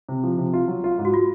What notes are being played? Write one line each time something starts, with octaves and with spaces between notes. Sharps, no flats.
C3
F3
C3
F4
F#3
F4
G#2
F#4
F4